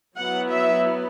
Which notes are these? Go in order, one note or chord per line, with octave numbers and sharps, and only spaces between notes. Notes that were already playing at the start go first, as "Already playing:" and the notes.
F#3 B3 E4 F#5
E5